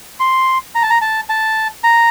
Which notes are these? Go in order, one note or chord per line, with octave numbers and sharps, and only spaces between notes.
C6
A#5
A5
A#5
A5
A5
A#5